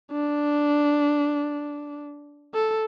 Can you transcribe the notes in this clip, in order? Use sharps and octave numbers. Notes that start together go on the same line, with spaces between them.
D4
A4